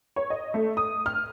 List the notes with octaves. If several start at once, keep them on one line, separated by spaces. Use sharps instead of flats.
C#5
D#5
A3
D#6
F6